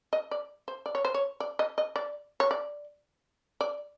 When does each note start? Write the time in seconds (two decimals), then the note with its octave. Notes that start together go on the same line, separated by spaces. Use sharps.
0.13 D#5
0.31 D5
0.68 C5
0.86 D5
0.95 C#5
1.05 C5
1.14 C#5
1.40 D5
1.59 D#5
1.78 D#5
1.96 D5
2.40 C#5
2.51 D5
3.61 D5